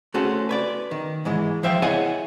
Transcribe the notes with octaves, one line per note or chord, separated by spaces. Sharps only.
A3 C#4 F#4 G#4 A4 C5
B4 C#5 D5
D#3
G#2 E3 G#3
F3 C5 E5 F5 G5
E4 G#4 C#5 D#5 F#5 G#5